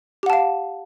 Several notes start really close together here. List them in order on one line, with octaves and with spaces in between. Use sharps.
G4 F#5 A5 F5